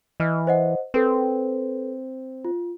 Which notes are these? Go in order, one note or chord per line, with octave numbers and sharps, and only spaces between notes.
E3 D#5 F6
C5 D#5 F#5
C4 A4 B4
F4